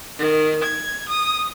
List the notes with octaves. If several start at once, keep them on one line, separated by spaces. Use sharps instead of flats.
D#3
G#6
D#6